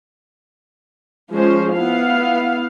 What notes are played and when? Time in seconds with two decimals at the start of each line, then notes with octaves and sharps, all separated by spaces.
1.30 F3 G#3 C#4 C5
1.72 B3 E4 F5